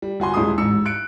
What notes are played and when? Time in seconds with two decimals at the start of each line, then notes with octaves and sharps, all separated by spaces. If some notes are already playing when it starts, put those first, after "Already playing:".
0.02 G3
0.20 G1 F#4 G#5 C6
0.34 D#1 G#3 E4 C6 D#6
0.58 A1 G#2 E6 C#7
0.85 F#6 C#7 D7